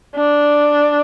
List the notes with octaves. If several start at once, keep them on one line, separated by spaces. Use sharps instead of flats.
D4